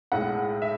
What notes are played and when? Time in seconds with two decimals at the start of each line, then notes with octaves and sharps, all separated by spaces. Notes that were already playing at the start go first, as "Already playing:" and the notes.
0.12 B1 A2 G#3 F#5
0.62 E5